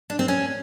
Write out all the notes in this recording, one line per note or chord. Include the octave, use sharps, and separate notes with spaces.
D4
C4
C#4